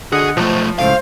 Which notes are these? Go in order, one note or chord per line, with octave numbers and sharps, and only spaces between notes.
D3 F#4 G#4 D#5 F#5
B1 F3 A3 C5
C#2 A2 C5 F5